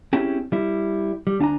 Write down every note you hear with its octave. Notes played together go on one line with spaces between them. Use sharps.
C4 C#4 E4 G4 G#4
G3 E4
G3
D2 D4 F5 G#5 A#5